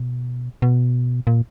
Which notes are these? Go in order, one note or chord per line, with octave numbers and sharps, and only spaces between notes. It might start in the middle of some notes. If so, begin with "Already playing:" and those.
Already playing: B2
B2
A#2